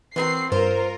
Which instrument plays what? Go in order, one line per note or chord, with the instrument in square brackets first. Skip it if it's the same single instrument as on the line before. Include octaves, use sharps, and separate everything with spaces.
[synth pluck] E3 [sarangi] C4 [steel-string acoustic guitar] F#4 A#4 B4 [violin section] C7
[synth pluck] G2 [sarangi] F4 [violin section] A#4 [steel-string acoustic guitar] C5